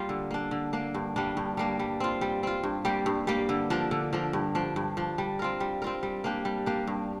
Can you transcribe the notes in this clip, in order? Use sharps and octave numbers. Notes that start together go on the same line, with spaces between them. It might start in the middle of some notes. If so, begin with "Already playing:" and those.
Already playing: G3 A#3 F4
D3
A#3 D4
D3
A#3 D4
G2
G3 A#3 D4
G2
G3 A#3 D4
G3
C4 F4
G3
C4 F4
G2
G3 A#3 G4
G2
G3 A#3 G4
D3
F3 D4 A#4
D3
F3 D4 A#4
G2
F3 D4
G2
F3 D4
G3
C4 F4 A#4
G3
C4 F4 A#4
G3
A#3 D4 G4
G3
A#3 D4 G4
G2